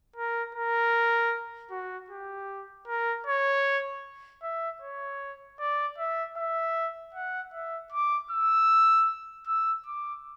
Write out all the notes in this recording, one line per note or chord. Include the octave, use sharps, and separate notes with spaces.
A#4
A#4
F#4
G4
A#4
C#5
E5
C#5
D5
E5
E5
F#5
E5
D6
E6
E6
D6